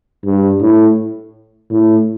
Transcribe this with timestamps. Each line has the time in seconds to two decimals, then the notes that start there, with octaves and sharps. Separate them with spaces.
0.25 G2
0.61 A2
1.71 A2